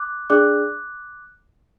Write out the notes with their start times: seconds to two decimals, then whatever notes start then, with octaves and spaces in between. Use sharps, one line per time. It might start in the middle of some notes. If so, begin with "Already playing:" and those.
Already playing: D6 F#6
0.30 D4 G#4 D5 D6 F#6